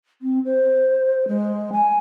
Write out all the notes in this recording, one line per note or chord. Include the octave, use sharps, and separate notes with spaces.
C4
C5
G#3
G#5